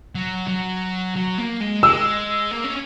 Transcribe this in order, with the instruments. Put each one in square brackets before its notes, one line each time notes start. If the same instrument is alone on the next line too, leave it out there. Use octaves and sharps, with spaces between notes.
[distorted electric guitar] F#3
F#3
F#3
A#3
G#3
[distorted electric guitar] G#3 [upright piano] E6
[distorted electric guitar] A#3
C#4